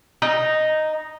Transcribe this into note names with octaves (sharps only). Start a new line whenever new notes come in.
D#4